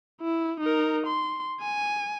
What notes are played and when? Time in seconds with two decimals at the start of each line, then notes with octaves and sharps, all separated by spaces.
0.21 E4
0.60 D#4 A#4
1.07 C6
1.61 G#5